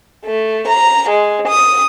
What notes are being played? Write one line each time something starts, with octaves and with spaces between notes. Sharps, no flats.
A3
A#5
G#3
D#6